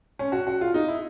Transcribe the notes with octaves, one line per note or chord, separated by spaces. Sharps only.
C#4
F#4
F#4
F4
D#4
E4